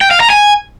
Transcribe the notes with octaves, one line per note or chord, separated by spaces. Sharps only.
G5
F5
A#5
G#5